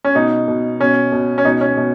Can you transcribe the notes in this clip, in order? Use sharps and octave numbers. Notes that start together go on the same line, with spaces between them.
C#4
B2 D#4
B2
B2 C#4
B2
C#4
B2 D#4
C#4
B2